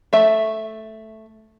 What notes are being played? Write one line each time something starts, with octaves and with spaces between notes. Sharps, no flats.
A3 E5